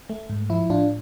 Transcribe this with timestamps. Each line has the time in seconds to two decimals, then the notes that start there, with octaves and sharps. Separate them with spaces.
0.09 A3
0.30 G#2
0.50 F3 E4
0.70 A2 D4 F4